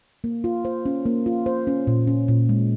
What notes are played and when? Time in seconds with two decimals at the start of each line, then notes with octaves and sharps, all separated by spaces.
0.24 A#3
0.44 F4
0.65 C5
0.86 C#4
1.06 A#3
1.26 F4
1.46 C5
1.67 C#4
1.87 A#2
2.07 C#4
2.28 A#2
2.49 G#3